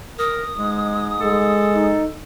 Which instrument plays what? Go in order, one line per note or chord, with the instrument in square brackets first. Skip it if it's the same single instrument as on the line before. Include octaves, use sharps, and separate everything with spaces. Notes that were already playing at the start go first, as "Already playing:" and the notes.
[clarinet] A#4 [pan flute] D#6
[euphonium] G#2 [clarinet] G#3
[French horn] G#3 [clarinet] A4
[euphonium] D#4